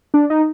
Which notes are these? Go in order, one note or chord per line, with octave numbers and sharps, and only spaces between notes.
D4
D#4